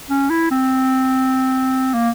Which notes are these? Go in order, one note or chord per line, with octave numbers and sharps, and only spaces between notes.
C#4
E4
C4
A#3